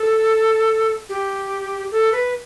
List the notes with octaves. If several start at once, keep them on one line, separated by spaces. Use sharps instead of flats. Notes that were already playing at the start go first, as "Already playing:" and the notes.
Already playing: A4
G4
A4
B4